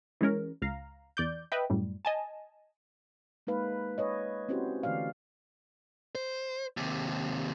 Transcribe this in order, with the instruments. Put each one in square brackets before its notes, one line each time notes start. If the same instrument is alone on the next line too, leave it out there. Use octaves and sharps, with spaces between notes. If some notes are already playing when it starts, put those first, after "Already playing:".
[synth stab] E3 G#3 C#4 A#4
C#2 F5 A#5
E2 D5 G6
B4 D#5 E5 G5
F#2 A2 G3
D#5 G#5 A5
[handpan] G#3 A#3 D#4 B4 F5
B4 C#5 D#5
C4 C#4 E4 F#4 G4 C5
D3 E3 A3 D5 F5
[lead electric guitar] C5
D#2 C3